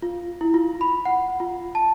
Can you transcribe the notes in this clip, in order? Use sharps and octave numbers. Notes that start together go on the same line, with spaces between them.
F4
E4
F4
B5
F#5
F4
A5